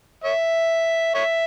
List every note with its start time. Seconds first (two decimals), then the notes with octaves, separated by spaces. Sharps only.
0.24 C#5 E5
1.15 C#5 E5